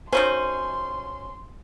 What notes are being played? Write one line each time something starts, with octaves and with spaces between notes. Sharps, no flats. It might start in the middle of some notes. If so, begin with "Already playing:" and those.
D#3 F#3 C#4 C5 C6